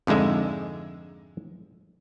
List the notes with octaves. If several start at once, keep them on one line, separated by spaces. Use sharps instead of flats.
F2 G#2 D3 G#3 E5